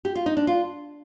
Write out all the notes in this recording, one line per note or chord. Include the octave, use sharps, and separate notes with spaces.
G4
F4
D#4
D4
F4